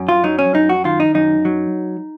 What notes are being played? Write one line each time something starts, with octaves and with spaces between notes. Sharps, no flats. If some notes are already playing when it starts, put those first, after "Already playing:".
Already playing: F#2
F4
F#3 D#4
C#4
F#2 D#4
F#4
D#3 F4
D#4
F#2 D#4
F#3